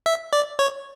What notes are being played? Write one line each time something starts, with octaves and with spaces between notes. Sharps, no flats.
E5
D5
C#5